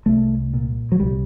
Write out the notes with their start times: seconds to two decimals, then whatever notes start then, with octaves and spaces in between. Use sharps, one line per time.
0.06 C2 A3
0.54 A#2
0.92 F#3
1.00 C2 G3